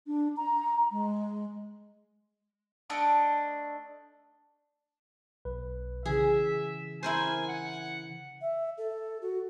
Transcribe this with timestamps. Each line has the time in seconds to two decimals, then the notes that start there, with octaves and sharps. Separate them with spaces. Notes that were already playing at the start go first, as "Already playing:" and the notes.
0.07 D4
0.37 A#5
0.91 G#3
2.90 A3 D4 D#5 D6
5.45 B1 B4
6.06 C#3 E3 G#4 E5
7.03 E4 A#4 C5 G#5
7.48 F#5
8.41 E5
8.78 A4
9.22 F#4